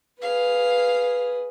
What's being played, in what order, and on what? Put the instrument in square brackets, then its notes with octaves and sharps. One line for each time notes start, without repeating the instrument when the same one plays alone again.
[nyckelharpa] G#4 B4 [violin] F5